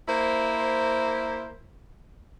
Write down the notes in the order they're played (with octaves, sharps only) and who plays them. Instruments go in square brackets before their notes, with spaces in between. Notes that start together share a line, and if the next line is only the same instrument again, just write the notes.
[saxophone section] A#3 E4 C5